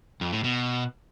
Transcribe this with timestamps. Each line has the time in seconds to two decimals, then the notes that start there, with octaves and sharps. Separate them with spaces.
0.21 F2
0.33 A2
0.44 B2